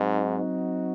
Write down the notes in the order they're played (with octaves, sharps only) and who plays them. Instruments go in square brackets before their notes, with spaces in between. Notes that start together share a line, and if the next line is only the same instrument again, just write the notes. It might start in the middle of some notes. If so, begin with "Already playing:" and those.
Already playing: [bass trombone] G#2 [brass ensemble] F#3 C4 D#4 F#4